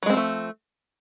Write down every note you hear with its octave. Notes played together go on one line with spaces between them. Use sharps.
F3 F#3 G#3 A3 C4